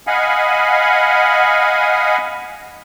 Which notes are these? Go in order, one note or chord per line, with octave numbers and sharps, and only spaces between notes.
D#5 F5 F#5 G#5 B5